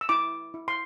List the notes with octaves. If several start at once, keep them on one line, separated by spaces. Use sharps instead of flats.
E6
E4 D6
E4
C6